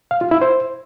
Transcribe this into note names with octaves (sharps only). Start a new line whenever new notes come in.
F5
F4
E4
C5